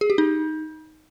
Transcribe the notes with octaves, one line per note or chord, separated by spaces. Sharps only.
G#4
G4
D#4